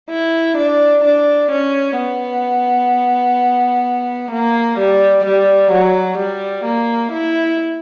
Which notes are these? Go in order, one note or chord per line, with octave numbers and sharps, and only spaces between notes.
E4
D4
D4
C#4
B3
A#3
G3
G3
F#3
G3
A#3
E4